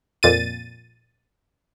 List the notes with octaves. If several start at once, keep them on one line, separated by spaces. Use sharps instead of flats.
F2 A#2 A6 D#7